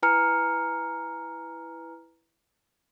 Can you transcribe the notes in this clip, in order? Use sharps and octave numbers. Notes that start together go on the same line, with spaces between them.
E4 B4 G#5 A#5 F6 C#7